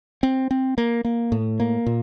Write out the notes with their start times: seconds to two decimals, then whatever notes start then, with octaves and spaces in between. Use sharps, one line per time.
0.23 C4
0.51 C4
0.78 A#3
1.05 A#3
1.32 A2
1.60 A#3
1.86 A#2